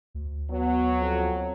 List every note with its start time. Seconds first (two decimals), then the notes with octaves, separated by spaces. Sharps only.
0.15 D2
0.50 F#3 B3
1.00 F2